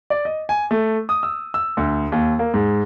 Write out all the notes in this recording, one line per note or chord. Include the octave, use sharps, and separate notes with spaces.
D5
D#5
G#5
A3
D#6
E6
E6
D2
D#2
A#3
G#2